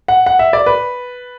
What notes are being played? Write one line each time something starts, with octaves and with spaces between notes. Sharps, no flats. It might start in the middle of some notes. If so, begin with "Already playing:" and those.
F#5
F#5
E5
D5
B4